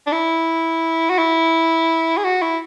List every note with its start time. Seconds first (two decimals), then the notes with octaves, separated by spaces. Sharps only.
0.07 D4
0.12 E4
1.10 F#4
1.18 E4
2.18 G#4
2.24 F#4
2.42 E4